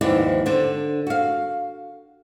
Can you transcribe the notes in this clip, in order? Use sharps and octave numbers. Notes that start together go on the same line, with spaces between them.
D#2 G#2 E3 F3 E4 D5
D3 D4 C5
F#4 F5